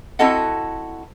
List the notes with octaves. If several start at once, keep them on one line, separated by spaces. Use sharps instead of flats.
C4 E4 F#4 A4 D#5 F#5